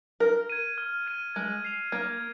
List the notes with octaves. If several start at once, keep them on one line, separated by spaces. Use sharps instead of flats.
A#4 F6
G#6 D#7
F6
G#6 D#7
G#3 G#6
C7 F7
A#3 G#6